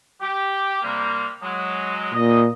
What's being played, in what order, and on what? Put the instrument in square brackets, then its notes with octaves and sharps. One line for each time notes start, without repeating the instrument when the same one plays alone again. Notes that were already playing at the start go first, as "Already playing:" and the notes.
[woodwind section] G4
C3 G3 A#3
F#3 G#3
[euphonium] A#2 [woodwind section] D#5